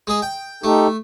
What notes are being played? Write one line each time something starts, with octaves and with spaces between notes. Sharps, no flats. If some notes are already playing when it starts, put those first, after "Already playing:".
G#3 G#4
G5
A3 D#4 G4 A4